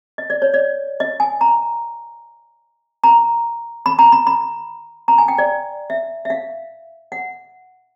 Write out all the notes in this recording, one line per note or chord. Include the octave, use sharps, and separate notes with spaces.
D#5
D5
C#5
D5
D#5
G#5
A#5
A#5
B5
A#5
B5
B5
A#5
G#5
G5
D5
E5
E5
F5
F#5